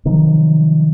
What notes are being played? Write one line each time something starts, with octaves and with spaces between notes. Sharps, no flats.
C3 D#3 F3 F#3